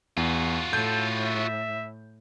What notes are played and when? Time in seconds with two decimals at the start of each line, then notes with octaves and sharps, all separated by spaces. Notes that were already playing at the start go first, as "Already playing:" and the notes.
0.17 E2 F4 F#4
0.73 A2 A4 G6
1.23 E5